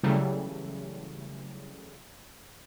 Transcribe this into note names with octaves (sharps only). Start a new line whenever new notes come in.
C#3 E3 F#3 G3 A3